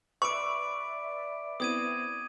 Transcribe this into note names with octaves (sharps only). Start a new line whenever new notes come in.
B4 D5 E5 C#6 D6 E6 D7
B3 C4 E4 D#6 G#6 D#7